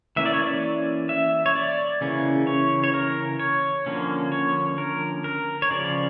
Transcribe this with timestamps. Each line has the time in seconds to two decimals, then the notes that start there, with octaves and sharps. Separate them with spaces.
0.16 E3 A#3 C#4 E5
0.26 D5
0.33 C#5
0.43 D5
1.09 E5
1.46 C#5
1.55 D5
2.01 C#3 E3 A#3 C#4
2.47 C#5
2.84 C#5
2.94 A#4
3.40 C#5
3.86 D3 F3 A#3 C#4
4.32 C#5
4.78 A#4
5.24 A#4
5.62 C#5
5.71 C#3 F3 C#4 D5